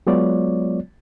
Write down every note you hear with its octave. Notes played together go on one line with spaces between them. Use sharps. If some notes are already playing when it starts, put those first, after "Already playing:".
F#3 G#3 B3 F4 C#5 D5